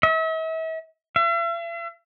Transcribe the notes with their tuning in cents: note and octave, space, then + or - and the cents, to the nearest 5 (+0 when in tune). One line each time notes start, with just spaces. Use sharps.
E5 -40
E5 +45